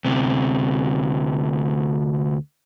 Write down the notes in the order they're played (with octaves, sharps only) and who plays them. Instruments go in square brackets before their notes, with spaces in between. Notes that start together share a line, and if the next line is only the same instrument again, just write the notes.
[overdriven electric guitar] D2 C3